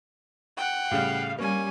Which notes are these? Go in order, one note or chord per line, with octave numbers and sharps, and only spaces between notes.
F#5 G5
A2 C#3 G3 F5
G3 A#3 C#4 G#5